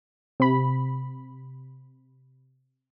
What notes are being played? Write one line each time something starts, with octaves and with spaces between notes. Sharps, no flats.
C3 B5